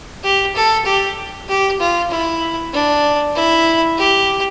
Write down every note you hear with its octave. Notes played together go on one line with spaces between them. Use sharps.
G4
A4
G4
G4
F4
E4
D4
E4
G4